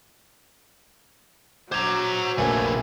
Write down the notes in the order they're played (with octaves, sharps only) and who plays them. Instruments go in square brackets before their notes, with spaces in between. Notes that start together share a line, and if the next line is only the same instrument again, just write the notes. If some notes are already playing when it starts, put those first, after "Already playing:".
[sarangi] F#3 [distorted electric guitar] C5 A#5 [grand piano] D6 G#6
[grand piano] A#1 A#3 [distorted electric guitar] C3 A3 [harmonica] B4 G#5